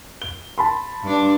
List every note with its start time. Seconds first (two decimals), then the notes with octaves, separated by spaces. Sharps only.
0.22 G7
0.58 A5 B5 C6
1.03 G2 D4